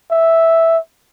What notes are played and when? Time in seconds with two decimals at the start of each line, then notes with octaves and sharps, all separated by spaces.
0.11 E5